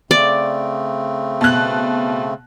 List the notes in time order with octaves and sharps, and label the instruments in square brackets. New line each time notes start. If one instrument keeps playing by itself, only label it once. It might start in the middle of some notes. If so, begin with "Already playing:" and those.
[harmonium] C#3 A3 C4 [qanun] D5
[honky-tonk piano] B2 F#6